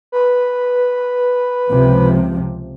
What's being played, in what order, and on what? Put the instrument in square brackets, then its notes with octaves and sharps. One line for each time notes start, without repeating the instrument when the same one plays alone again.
[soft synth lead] B4
[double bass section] C#2 C3 F3